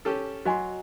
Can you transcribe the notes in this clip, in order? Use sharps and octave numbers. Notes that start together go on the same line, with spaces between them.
C#4 G4 A4
F#3 F#4 D#5 G#5 C6